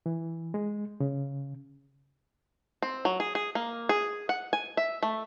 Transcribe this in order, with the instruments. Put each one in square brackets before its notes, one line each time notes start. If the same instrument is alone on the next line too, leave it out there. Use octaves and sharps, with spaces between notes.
[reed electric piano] E3
G#3
C#3
[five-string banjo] C4
F#3
G#4
G#4
A#3
G#4
F#5
G#5
E5
A3